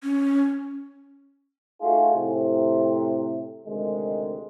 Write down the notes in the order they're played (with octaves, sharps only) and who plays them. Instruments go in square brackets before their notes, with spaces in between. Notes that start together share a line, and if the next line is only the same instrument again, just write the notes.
[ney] C#4
[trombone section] A3 D#4 F4 F#4 G#4
A2 C3
D2 C3 D#3 G#3